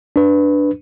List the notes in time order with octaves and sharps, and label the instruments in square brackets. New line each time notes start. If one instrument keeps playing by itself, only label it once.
[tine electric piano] D4 B4